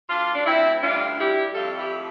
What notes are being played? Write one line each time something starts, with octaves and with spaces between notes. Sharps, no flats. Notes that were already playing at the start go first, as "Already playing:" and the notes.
D2 D4 F4
D4
D2 C4 E4
G2 D4 F4
G3 E4 G4
F2 F4 A4
E4 G4
A3